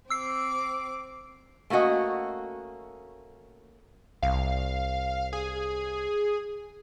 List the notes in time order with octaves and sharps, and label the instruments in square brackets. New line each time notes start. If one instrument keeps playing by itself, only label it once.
[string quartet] C4 D6 [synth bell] E6 C7
[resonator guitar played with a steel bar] A3 A#3 C#4 F#4 D#5
[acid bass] C2 [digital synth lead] F5
[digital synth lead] G#4